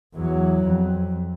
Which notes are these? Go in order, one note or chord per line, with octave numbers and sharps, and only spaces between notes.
E2 F#3
F2